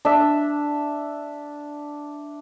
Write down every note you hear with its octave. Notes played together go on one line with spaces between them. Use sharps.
D4 E5